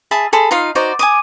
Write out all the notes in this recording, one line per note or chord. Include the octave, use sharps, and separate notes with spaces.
G#4 E5 A5 B5
G#4 A4 B5 C6
D#4 F4 F5
D#4 F#4 C5 D5
G#5 D6 D#6